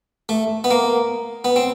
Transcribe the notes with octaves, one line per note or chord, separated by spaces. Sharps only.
A3
B3
A#3
B3
C4